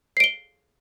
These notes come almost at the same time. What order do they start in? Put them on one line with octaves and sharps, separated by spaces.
C7 D7 G7